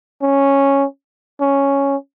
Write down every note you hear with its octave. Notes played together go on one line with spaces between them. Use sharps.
C#4
C#4